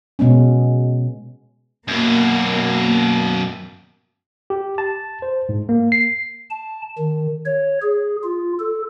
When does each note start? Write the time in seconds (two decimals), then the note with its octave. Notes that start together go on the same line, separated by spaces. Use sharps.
0.19 B2 G#3 B3 C#4
1.88 F#2 B2 A#3
4.50 G4
4.78 A5
5.22 C5
5.49 G#2
5.69 A#3
5.92 C7
6.50 A5
6.99 D#3
7.46 C#5
7.82 G#4
8.24 F4
8.59 A4